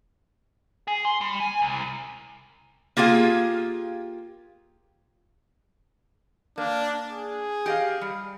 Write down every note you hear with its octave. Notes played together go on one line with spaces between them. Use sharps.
G#4
C6
G3
G#5
C2
A#3 F4 G4 G#4 F5
A#3 D4
G#4
G4 D#5 F5
G3